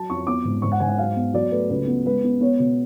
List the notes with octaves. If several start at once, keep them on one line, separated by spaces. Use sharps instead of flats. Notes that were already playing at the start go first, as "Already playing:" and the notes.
Already playing: F#3 A5
F2 C#6
B3 D6
G#2
G#2 C#6
F#5
G#2 G#5
F#5
F#3 F5
B3
F#3 D5
A3 B4
C#2 B4
B3
G#3 B4
B3
B3 C#5
B2